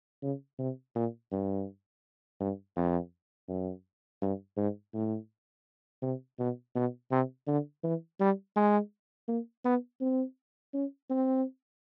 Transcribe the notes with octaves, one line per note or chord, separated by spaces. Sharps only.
C#3
C3
A#2
G2
G2
F2
F#2
G2
G#2
A2
C3
B2
B2
C3
D3
E3
G3
G#3
A#3
B3
C4
C#4
C4